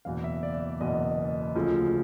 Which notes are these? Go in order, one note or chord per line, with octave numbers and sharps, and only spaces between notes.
F#1 E2 B2 F5
E5
D5
D5
F#1 E2 B2 D#5
D2 C#3 F3